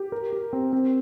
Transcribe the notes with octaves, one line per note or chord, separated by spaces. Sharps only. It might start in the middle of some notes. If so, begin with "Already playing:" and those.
Already playing: G4
A#4
G4
C4
C4